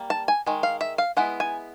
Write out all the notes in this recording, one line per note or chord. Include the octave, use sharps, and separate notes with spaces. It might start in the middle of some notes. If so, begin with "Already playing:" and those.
Already playing: G3 A#3
A5
G#5
D#3 G#3
F5
E5
F5
G#3 B3 E4 F#5
G#5